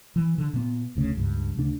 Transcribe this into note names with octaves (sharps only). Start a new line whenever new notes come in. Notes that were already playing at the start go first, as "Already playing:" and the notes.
E3
D3
A#2 B3
F1 D2 C#3
C#2 G2
D2 C#3 D4